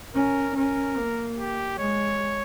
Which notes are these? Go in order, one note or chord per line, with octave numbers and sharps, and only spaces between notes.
C#4 A#4
C#4 A#4
A#3
G4
G#3 C#5